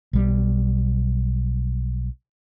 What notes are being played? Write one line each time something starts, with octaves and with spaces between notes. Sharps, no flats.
B1 G3